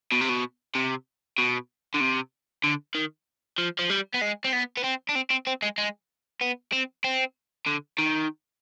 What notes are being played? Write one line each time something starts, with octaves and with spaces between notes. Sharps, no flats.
B2
C3
B2
C3
B2
D3
C3
D3
D#3
F3
F3
G3
B3
G#3
C4
B3
B3
C4
D4
C4
C4
C4
G#3
G#3
B3
C4
C4
D3
D#3